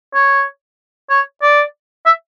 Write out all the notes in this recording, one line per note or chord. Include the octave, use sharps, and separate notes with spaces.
C#5
C#5
D5
E5